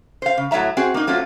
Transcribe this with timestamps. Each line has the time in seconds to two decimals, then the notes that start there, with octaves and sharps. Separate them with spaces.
0.22 C5 F5
0.37 C#3
0.51 A2 F#3 F#4 E5 A#5
0.77 C4 F#4 G#4
0.94 A#3 D#4
1.07 F#3 A3 C4 F4